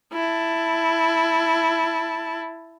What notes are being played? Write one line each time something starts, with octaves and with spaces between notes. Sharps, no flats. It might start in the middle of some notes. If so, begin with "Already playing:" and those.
E4 A5